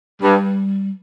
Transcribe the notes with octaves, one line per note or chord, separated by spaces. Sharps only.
G2 G3